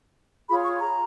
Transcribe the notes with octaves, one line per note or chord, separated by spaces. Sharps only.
F4 G#4 C#5 B5
C#6
A#5